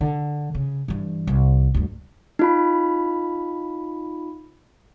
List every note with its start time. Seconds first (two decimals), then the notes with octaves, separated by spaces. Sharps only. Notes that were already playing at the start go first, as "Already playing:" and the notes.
0.01 D3
0.55 C#3
0.88 G2 E3
1.27 C2
1.74 D2 G2
2.39 D#4 F4 B5